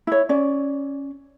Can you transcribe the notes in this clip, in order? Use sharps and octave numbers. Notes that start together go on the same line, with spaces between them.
E4 C#5
C#4 D5